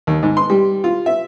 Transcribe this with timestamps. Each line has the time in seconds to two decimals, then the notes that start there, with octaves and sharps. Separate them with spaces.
0.07 D#2
0.23 G#2
0.37 C6
0.50 G3
0.84 F4
1.06 E5